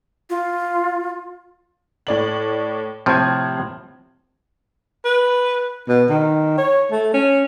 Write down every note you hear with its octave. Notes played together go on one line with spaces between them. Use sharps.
F4
A2 D5 F#7
A2 C3 F3 C4 G#6
B4
B2
D#3
C#5
A3
C#4